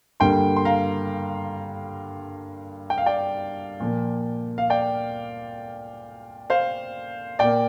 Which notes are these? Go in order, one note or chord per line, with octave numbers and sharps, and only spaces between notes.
G2 D3 G3 A#3 G5 C6
C6
F5 A#5
G5
F5
D5 G5
A#2 F3 A#3
F5
D5 G5
C5 F5
A#2 A#3 D5 G5